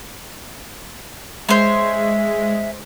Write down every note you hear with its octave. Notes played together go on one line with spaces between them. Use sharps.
G#3 C5 C#5 E5